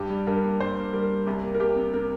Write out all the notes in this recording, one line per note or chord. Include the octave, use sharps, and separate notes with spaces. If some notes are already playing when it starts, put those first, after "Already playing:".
Already playing: G2 G4
G3
G2 A#4
A#3
G2 C5
A#3
G3 A#4
A#3
C2 G4
A#3
A#4
C2 G4
C3
C3 A#4